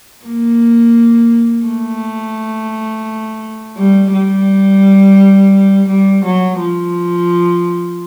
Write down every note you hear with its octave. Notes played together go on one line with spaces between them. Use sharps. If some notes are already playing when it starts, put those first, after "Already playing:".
A#3
A3
G3
G3
G3
F#3
F3